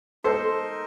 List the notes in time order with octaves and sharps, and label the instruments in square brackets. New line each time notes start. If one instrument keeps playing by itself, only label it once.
[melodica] D#4 A#4 D#5 [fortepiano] A4 C5